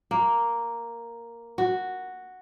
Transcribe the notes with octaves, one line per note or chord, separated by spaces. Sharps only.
A#3
F#4